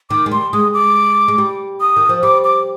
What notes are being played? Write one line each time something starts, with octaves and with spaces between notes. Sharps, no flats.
D#3 D6
G#3
G3 C6
G#3 D#6
D6
G#3
G3
D#6
D#3
F3
G3 D6
D6